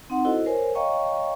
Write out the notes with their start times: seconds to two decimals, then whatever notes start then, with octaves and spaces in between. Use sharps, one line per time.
0.10 C4 D#4 F#5 C6
0.25 E4 F#4 A4 C5 D#5
0.46 A#4 C5 C#5 G#5
0.75 C#5 D#5 F5 G5 A#5 C#6